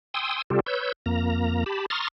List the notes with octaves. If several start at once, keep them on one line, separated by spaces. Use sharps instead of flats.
G5 G#5 C6 D#6 E6
C3 G3 F4 G4 A4
B4 C#5 E6 G6
F2 A#3 A#5
G4 A5 B5
A#5 C6 C#6 D#6 F6 A6